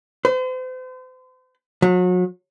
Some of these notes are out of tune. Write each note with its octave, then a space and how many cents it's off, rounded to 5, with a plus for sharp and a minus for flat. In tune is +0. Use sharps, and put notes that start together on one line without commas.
C5 -40
F#3 -35